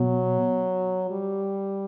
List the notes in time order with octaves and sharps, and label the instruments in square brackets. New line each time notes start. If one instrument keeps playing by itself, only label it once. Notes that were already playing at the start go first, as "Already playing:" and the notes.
Already playing: [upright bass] B2 [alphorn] F#3
[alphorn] G3